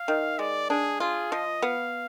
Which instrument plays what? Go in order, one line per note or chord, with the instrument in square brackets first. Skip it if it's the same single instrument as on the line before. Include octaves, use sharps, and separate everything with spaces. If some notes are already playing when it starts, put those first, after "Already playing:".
Already playing: [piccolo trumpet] F5
[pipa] D#3
[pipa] G#3 [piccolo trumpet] D5
[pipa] D4 [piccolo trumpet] G#4
[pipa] F4 [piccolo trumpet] G#4
[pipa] F3 [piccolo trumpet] D#5
[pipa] B3 [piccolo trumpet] F5